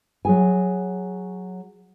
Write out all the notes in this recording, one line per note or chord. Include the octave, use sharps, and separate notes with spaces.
F#3 G#4 G#5